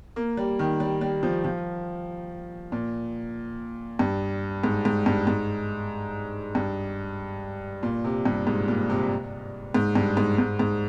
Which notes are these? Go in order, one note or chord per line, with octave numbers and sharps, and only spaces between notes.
A#3
G3
D#3
G3
G3
F3
F3
A#2
G2
G#2
G#2
G2
G#2
G2
A#2
C3
G2
G#2
A#2
C3
G#2
G2
G#2
G#2
G#2